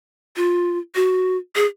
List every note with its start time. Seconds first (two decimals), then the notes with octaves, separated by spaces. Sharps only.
0.36 F4
0.95 F#4
1.56 G#4